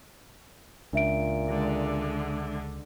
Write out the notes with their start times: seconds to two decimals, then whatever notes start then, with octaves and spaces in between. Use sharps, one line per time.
0.93 C#2 A#2 D4 E5 D7
1.48 D3 G#3